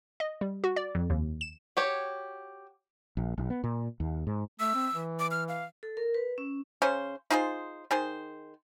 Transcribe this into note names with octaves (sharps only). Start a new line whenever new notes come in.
D#5
G3
F#4
D5
F2
D#2
E7
F#4 G4 C#5
A#1
B1
B3
A#2
D#2
G#2
A3 E6
C4
E3
D6
F6
F5
A4
A#4
B4
C#4
C#3 C#4 C5
D#4 F4 G#4 C5
D#3 G#4 C5